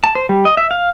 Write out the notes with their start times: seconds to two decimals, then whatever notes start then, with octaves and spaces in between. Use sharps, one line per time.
0.04 A5
0.15 C5
0.29 G3
0.45 D#5
0.57 E5
0.71 F5